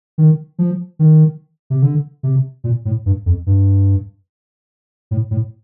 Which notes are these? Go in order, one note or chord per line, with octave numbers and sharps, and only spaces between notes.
D#3
F3
D#3
C3
D3
C3
A#2
A2
G2
F2
G2
A2
A2